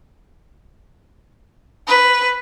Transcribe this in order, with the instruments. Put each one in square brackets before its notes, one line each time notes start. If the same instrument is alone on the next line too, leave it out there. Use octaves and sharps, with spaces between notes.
[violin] B4